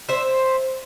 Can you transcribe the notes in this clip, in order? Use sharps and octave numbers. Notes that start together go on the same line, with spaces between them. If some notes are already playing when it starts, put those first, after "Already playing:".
C5 E5